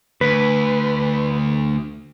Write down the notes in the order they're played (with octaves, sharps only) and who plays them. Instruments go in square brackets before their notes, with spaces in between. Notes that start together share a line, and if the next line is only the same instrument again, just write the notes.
[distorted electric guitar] D2 [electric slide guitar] B4